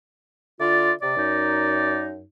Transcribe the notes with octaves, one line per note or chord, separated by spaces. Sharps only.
D3 E4 F4 D5
C3 D5
F#2 D#4